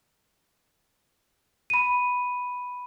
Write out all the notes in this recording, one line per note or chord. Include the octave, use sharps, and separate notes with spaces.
B5 D#7